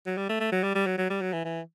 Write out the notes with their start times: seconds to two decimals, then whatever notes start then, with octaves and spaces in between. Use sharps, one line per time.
0.06 F#3
0.17 G3
0.29 A3
0.40 A3
0.52 F#3
0.63 G3
0.75 G3
0.87 F#3
0.98 F#3
1.10 G3
1.21 F#3
1.33 E3
1.45 E3